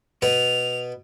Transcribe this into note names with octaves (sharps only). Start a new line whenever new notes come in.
B2 B3 F7